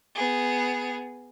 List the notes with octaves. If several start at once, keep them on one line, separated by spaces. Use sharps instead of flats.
B3 G#4